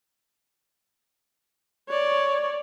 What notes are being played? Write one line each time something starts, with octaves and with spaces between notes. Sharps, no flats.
C#5 D5